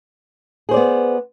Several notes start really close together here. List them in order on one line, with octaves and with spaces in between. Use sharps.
G#4 C5 D5 B3